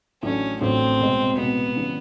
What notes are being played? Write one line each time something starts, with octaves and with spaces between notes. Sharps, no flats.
A1 A2 F#3 A3 C#4 D4
A1 A2 F#3 A3 C4 D4
C2 B2 G#3
C2 B2 G#3 B3
C#3 E3 G3